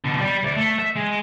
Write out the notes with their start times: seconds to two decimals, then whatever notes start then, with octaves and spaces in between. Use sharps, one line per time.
0.04 B2 D3
0.19 G3 D5
0.43 D2 D5
0.56 A3
0.79 E5
0.96 G#3